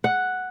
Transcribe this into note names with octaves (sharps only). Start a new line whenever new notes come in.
F#5